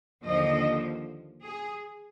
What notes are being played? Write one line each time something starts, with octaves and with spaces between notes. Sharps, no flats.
D#2 D3 F3 D#5
G#4